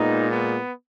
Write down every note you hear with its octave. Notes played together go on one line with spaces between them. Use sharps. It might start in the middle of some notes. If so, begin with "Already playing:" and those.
Already playing: A#2 G#3 B3 D#4
B3